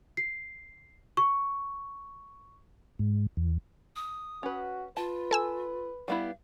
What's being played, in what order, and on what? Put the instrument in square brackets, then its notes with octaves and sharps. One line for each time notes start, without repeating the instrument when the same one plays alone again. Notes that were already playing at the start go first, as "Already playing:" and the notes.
[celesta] C7
C#6
[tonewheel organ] G#2
E2
[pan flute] D#6
[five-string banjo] C#4 B4 [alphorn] F#4
[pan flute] F4 [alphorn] B4 [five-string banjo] A5
[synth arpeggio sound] A4 G#5 E6
[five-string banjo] G3 B3 E4 [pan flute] F5